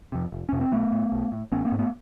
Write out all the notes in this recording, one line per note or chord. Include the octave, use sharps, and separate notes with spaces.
F2 C3
F1
F2 C3 C#4
C4
B1 A3 B3
A2
B1
A2
A1 B3 C#4
A#3 C4
G#2
A3 B3